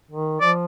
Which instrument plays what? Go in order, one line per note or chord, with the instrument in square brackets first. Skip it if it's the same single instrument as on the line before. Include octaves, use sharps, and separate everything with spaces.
[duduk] D#3
[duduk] F3 [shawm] D5